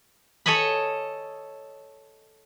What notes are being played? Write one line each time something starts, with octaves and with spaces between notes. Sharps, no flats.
A4 C#5 D#5 G#5 B5